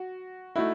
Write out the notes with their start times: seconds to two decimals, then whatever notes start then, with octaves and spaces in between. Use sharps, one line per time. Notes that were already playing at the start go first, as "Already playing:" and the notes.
Already playing: F#4
0.56 A3 D#4 E4 F#4